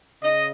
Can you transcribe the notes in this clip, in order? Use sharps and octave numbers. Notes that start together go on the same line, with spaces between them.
C#3 D#5